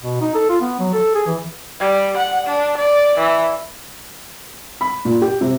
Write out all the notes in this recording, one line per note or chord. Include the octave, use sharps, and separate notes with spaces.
B2
D#4
A4
F4
B3
F#3
A4
G#4
E3
G3
F#5
D4
D5
E3
B5
A#2
G4
C3